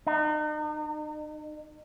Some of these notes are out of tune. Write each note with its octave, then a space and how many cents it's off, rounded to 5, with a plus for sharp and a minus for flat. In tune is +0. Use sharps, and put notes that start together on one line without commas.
D#4 -40